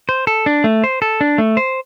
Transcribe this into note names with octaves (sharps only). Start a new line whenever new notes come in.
C5
A4
D4
A3
C5
A4
D4
A3
C5